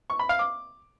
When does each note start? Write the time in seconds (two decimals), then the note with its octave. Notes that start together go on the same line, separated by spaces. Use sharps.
0.10 C#6
0.19 B5
0.29 F5
0.39 D6